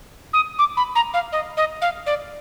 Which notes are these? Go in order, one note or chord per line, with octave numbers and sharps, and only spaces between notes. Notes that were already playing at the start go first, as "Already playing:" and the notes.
D#6
D6
B5
A#5
F5
D#5
D#5
F5
D5